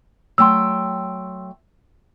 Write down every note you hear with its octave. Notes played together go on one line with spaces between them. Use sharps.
F#3 A3 G5 C6 E6